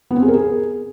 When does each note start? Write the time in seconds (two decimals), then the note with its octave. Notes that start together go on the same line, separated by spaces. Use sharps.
0.11 B3
0.16 C4
0.22 G#4
0.28 A#4
0.34 G#4